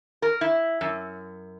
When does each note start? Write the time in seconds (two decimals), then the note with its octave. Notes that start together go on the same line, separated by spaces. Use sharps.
0.22 A#4
0.41 E4
0.81 F#2